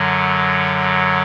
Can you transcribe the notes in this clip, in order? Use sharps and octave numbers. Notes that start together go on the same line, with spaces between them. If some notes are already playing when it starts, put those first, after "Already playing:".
Already playing: F#2 D3 F#3